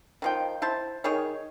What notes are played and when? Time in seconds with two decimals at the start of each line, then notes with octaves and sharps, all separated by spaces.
0.22 D#3 F3 G5
0.62 E4 C5 A5
1.04 D#3 G#4 C#5